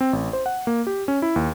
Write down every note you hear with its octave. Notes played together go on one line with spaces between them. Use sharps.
C4
A1
C5
F#5
A#3
G4
C#4
E4
D#2